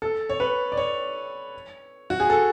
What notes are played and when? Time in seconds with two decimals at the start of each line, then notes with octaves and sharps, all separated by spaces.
0.02 A4
0.29 C#5
0.40 B4
0.72 D5
0.77 C#5
2.10 F#4
2.20 G#4
2.30 A4